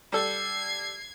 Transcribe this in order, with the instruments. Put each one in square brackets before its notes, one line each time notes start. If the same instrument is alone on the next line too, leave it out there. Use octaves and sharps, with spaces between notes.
[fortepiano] G3 A4 [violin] G#6 C7